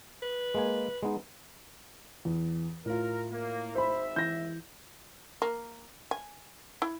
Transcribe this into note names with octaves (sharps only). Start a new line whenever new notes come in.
B4
G#3 A#3 G#5
G#3 B3 D#4
E2
A2 F4 A#4
A#3
G#1 C5 E5 B5
E3 G6 A#6
A#3
G#5
E4